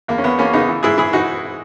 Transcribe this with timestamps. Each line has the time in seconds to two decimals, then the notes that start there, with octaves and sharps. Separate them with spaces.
0.08 E2 A#3
0.18 C#4
0.24 E2 B3
0.38 E2 A#3 C#4
0.53 C#3 B3 D#4
0.68 E3
0.83 G#2 E4 G#4
0.98 E3 E4 G#4
1.13 E3 D#4 F#4